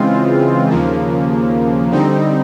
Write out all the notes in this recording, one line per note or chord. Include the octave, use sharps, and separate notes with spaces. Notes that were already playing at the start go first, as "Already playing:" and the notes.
Already playing: C#3 E3 G#3 C4 F4
D#2 C#3 F3 A#3
D3 G3 C4 D#4